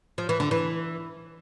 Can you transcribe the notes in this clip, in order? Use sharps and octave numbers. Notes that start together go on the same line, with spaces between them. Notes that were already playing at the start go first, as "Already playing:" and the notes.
F3
E3
D3
E3